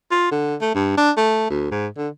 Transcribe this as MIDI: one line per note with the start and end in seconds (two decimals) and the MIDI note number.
0.12 0.30 65
0.31 0.55 50
0.61 0.71 57
0.75 0.95 43
0.97 1.11 62
1.17 1.49 57
1.50 1.71 38
1.71 1.88 44
1.97 2.09 50